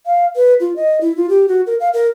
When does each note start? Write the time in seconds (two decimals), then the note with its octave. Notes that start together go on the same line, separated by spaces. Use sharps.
0.06 F5
0.36 B4
0.60 F4
0.76 D#5
1.01 E4
1.16 F4
1.29 G4
1.48 F#4
1.67 A#4
1.80 F5
1.94 A#4